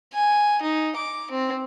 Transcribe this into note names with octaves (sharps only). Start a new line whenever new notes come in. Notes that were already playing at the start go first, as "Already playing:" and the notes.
G#5
D#4
D6
C4